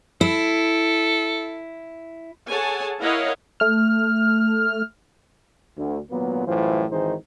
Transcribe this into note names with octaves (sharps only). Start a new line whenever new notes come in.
E4 A4
G#4 A4 C#5 F#5 G#5 A5
E4 A#4 C#5 D#5 F5 F#5
A3 F6
D2
G#1 A#2 F#3 A#3 B3
F#2 A2 E3 G3 F4 C5
G#1 D#3 E3 D#4 G#4 C5